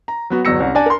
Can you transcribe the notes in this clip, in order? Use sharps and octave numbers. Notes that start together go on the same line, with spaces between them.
A#5
F#3 B3 F#4
G1 E2 F#3 E6 A#6 C#7
C2 C#4
D4 D5 G#5 A5
A#4 C6